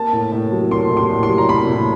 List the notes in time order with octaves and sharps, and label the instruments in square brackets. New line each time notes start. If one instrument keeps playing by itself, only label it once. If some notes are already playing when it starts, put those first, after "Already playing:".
Already playing: [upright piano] A#3 A5
A2
A2
F#3
A#3 C6
A2
C6
A2
C6
F#3
A#5
A#3 B5
A2